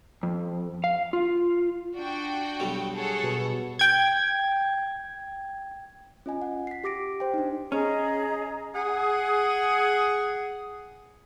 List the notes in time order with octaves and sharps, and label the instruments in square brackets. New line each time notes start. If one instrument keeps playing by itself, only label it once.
[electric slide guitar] F2
F5
F4
[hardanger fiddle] D4 [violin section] F#4 G5
[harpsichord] B1 G3
[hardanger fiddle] G#4 F#5 [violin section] A4 C#5
[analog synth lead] B2
[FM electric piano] G5 G#6
[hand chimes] C#4 F4 D#5 G#5
F#5
B6 C7
G4 D6 A#6 D7
C5 G5
D4 D#4
[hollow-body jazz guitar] C#4 [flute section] G#4 D#5 A#5
[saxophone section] G#4 F#5